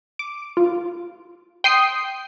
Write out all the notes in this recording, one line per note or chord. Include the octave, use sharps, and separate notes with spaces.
D6
F4
G5 C6 D#6 C7